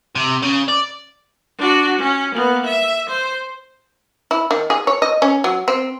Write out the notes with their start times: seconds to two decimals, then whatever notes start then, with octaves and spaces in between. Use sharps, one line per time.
0.15 C3
0.43 C#3
0.69 D5
1.58 D4 F#4
1.99 C#4
2.34 A#3 B3
2.66 E5
3.09 C5
4.31 E4
4.51 D#3
4.70 G#4
4.87 C#5
5.02 D#5
5.22 C#4
5.44 F#3
5.68 C4